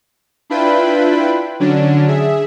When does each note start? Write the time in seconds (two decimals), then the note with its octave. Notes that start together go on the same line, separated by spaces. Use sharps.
0.50 D4 E4 F4 B4 G5 B5
1.60 D3 F#3 C#4 D4
2.08 G#4 E5